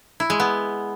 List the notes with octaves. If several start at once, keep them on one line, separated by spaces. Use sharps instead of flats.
E4
G#3
B3